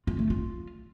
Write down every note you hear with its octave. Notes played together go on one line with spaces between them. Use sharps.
F4
A3
F4